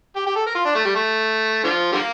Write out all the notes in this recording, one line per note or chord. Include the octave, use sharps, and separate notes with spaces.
G4
G4
A4
A#4
F4
D4
A3
G3
A3
D3 F3
D3 G3 A#3